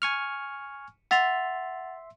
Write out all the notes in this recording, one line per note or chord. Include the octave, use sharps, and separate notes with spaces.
G#5 C#6 F6
E5 F#5 C6 A6 F7